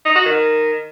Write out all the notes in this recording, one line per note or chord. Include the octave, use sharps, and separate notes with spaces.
D#4
F#4
D#3